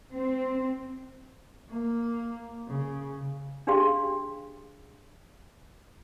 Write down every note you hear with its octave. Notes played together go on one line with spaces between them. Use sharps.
C4
A#3
C#3
D4 G4 G#4 F5 C6